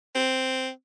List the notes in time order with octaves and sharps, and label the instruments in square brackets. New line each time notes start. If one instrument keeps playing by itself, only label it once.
[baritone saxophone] C4